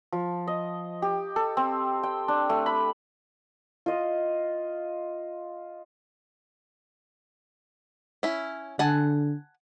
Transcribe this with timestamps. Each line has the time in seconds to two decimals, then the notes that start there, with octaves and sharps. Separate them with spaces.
0.12 F3
0.47 D#5
1.02 G4
1.36 A4
1.57 C4
2.03 G5
2.28 D4
2.49 A3
2.66 B5
3.86 F4 D#5
8.23 C#4 E4
8.79 D3 F#5 G#5 A5